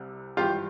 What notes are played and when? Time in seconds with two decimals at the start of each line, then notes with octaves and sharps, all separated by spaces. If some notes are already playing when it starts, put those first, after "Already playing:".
Already playing: C2 C3 G3
0.37 G#1 G2 E3 G3 F4 G4